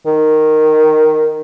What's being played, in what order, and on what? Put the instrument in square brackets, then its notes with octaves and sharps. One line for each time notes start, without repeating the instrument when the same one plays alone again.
[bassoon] D#3